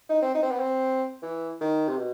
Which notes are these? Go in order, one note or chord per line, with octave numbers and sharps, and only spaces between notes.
D#4
C4
D#4
C4
B3
C4
E3
D#3
C3
B2